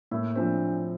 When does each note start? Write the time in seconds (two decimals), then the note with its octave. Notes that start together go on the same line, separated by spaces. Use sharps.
0.11 A2 A#3
0.36 F3 C4 D4